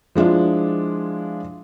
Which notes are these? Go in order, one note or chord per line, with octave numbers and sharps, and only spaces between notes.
F3 G#3 D4 E4 F4